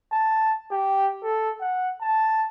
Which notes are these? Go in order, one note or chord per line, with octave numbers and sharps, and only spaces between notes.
A5
G4
A4
F#5
A5